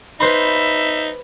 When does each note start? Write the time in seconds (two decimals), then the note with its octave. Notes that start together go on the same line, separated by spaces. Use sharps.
0.20 D#4 B4 C5 E5 B5